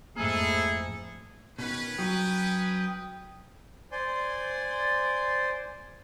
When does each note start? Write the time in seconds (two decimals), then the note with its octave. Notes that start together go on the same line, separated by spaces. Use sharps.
0.16 F2 G#2 A3 A#3 E4 G#4 A4
1.59 B2 D#3 C#4 B4
1.99 F#3 G5 D#6
3.92 C5 D5 G#5 C6